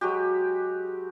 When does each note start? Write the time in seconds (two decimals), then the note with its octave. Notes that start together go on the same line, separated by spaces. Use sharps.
0.01 F#3 G#3 F#4 G4